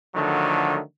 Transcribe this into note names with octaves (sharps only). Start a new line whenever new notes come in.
D3 D#3 F3 F#3 A3